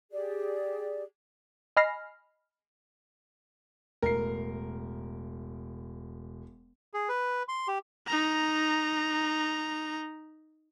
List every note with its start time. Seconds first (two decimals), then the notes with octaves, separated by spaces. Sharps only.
0.12 G4 G#4 D5
1.77 D#5 G#5 B5 F6 A#6 C7
4.02 E1 A2 A#4 C7
6.94 G#4
7.09 B4
7.48 C6
7.68 G4
8.07 D#4 A#5